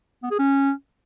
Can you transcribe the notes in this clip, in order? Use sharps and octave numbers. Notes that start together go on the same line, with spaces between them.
B3
G#4
C#4